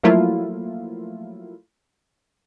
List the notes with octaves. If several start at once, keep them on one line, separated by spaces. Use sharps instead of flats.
F3 F#3 A3 A#3 E4 F4